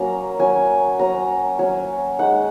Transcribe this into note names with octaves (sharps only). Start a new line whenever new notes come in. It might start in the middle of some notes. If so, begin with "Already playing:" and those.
Already playing: F#3 A#3 C#4 A#5
F#3 C#4 G#5
F#3 C#4 A#5
F#3 C#4 G#5
G#3 D#4 F#5